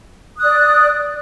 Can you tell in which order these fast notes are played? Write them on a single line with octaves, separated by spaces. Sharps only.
D#6 F#6 D5